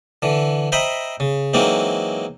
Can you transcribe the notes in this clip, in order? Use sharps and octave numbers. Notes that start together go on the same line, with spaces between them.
D3 E3
C5 D#5 E5 G5 A#5 B5
C#3
E3 F#3 G#3 A#3 C4 D#4